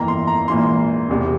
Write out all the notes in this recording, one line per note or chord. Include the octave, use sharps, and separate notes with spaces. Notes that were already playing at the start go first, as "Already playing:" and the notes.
Already playing: G1 F2 E3 A#3 E4 A#5
C6
A#5
A#1 G#2 E3 A#3 C6
E1 E2 C3